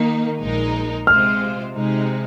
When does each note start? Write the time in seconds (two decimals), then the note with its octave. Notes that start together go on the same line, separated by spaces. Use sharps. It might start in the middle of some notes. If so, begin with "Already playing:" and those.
Already playing: D#3 A#3 D#4
0.40 A#1 A#2 G#3 D#4 A#4
1.07 C3 G#3 F4 C5 F6
1.74 C3 G#3 D#4